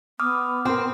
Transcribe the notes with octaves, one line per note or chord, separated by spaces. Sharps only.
B3 D6 D#6 F6
C4 A#4 G5